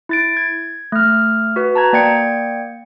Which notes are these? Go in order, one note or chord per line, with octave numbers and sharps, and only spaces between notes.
E4 A6 D7
G#6
A3 F6
F#4 B4
A5 A#5 G#6
A#3 D5 G5 G#6 C#7